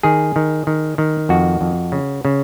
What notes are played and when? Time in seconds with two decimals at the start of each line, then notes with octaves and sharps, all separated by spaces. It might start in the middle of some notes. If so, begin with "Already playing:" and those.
0.03 D#3 G#4
0.36 D#3
0.67 D#3
0.98 D#3
1.29 F2 F#4
1.61 F2
1.92 C#3
2.25 C#3